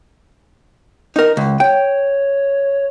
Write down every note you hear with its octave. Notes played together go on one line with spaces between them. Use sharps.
D#4 A#4
C#2
C#5 G5